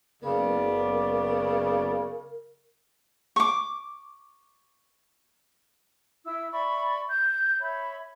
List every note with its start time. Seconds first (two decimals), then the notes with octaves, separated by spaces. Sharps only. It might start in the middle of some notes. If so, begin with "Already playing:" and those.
0.23 F#1 C#3 B3 A#4 D5
3.36 C#6 D6
6.25 E4 E5 E6
6.52 D5 E5 B5 C#6
7.09 G6
7.60 C#5 E5 B5